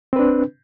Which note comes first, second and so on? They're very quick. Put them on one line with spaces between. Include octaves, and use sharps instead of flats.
C4 B4 D4